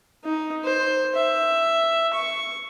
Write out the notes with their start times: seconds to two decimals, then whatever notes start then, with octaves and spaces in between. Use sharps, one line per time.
0.24 D#4
0.64 C5
1.15 E5
2.14 C#6